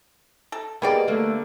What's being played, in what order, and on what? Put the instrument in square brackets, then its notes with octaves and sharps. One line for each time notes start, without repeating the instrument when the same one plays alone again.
[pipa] A4
[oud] A#3 D#5 [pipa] B3 G4 D5 [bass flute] G#4
[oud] D3 A#3 D4 [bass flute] A3